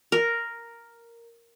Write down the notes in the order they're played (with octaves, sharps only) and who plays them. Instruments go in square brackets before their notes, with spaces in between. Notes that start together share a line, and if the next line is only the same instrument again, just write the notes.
[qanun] A#4